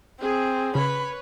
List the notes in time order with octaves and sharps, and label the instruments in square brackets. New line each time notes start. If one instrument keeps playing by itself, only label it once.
[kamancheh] C4 [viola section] G#4
[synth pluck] C#3 [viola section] B4 C#5 [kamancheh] B5